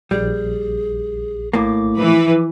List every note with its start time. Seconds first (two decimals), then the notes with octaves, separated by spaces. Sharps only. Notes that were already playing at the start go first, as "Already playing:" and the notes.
0.11 A#1 G3 G#4
1.53 A2 A#3 D6
1.98 E3 F3 E4 B4